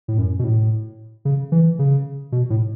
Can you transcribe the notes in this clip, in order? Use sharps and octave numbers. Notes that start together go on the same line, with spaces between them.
A2
F#2
B2
A2
C#3
E3
C#3
B2
A2